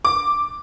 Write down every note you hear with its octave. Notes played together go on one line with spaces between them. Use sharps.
D6